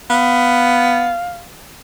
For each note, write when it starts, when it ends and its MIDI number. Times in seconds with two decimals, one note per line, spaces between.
0.10 1.15 59
0.10 1.44 77